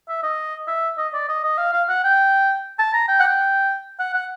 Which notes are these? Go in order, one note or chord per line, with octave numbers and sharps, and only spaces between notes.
E5
D#5
E5
D#5
D5
D#5
D#5
F5
F5
F#5
G5
A5
A#5
G5
F#5
G5
F#5
F#5